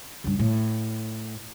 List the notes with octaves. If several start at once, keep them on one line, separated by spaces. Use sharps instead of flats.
C#2 G2
A2